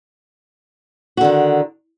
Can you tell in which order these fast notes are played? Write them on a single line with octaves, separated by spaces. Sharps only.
F#4 D3 D#3